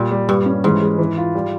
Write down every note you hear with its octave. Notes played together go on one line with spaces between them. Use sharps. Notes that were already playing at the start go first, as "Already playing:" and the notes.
Already playing: A#2 G3
G3
G2 G3
C#4
G#2 E3
G#3
E3
F4
G3